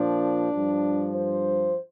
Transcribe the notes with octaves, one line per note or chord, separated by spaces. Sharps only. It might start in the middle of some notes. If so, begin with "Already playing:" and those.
Already playing: A#2 F3 D4
G2 F3
C5